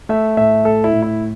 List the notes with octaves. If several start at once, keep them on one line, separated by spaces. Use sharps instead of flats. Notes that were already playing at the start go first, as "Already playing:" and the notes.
A3 E5
A2 E5
A3 A4
E4
A2
E4